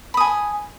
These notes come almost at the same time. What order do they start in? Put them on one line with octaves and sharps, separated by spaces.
B5 D#6 G#5